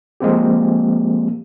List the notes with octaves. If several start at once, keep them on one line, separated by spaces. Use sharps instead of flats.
F3 G#3 A#3 C4 G4